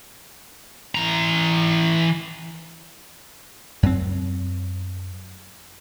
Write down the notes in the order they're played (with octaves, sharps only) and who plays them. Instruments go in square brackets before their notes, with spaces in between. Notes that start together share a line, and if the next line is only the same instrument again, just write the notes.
[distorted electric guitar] E3 A#5
[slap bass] F#2 C4